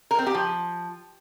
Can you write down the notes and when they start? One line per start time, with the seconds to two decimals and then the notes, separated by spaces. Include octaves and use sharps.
0.11 A#4
0.19 C4
0.27 G4
0.34 F3